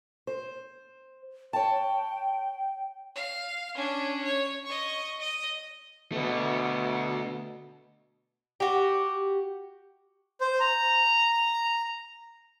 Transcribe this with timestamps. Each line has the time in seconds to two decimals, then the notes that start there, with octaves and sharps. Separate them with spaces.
0.27 C5
1.53 C#5 G5 A5
3.15 F5
3.75 C#4 D4
4.24 C#5
4.66 D#5 C#6
5.20 D#5
6.12 B2 D3 A3
8.60 F#4 G4
10.41 C5
10.60 A#5